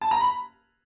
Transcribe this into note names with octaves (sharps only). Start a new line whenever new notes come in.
A5
A#5
B5